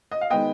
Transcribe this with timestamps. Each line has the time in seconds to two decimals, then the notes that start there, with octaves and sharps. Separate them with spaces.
0.12 D#5
0.21 F5
0.30 D#3 G#3 B3 D#5 G5